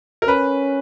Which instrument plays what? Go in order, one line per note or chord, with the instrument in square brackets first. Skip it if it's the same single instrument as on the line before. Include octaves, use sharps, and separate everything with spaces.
[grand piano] A#4
[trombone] C#4 [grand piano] B4